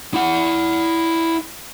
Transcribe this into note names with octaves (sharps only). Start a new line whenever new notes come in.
E4 F#5